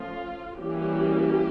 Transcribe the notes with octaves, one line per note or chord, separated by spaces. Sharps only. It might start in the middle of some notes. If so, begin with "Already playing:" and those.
Already playing: F3 A3 C#4 F4
E3 G3 A#3 C#4 G4